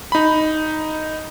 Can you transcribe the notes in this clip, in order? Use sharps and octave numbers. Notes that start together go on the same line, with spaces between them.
D#4 B5